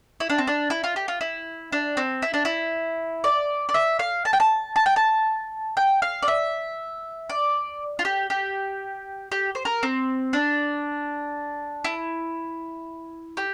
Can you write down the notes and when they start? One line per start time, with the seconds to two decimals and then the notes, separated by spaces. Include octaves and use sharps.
0.20 E4
0.30 D4
0.38 C4
0.47 D4
0.70 E4
0.84 F4
0.96 G4
1.08 F4
1.21 E4
1.72 D4
1.97 C4
2.22 E4
2.34 D4
2.45 E4
3.24 D5
3.69 D5
3.74 E5
3.99 F5
4.25 A5
4.33 G5
4.40 A5
4.76 A5
4.86 G5
4.96 A5
5.77 G5
6.02 F5
6.23 D5
6.28 E5
7.30 D5
7.99 F4
8.05 G4
8.30 G4
9.32 G4
9.55 C5
9.65 A#4
9.83 C4
10.33 D4
11.84 E4
13.37 G4